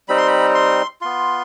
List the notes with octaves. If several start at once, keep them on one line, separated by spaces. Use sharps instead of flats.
G3 C4 D#4 B5
C6
B5
C6
B3 F4 C6